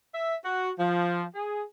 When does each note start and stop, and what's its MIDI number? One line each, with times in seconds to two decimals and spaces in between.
0.14 0.36 76
0.45 0.71 66
0.79 1.23 53
1.34 1.64 68